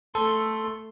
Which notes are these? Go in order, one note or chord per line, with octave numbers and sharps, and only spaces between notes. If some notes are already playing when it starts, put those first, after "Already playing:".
A3 A4 C6